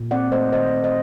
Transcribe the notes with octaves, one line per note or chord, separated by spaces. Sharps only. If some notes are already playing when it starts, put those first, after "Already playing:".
Already playing: A#2
C4 D5 F#5
A3 C5 D#5
D#3 C5 D#5
C4
C5 D#5